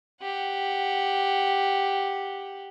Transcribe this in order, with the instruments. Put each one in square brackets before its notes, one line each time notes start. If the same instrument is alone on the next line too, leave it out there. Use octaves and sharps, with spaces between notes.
[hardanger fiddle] G4 F#5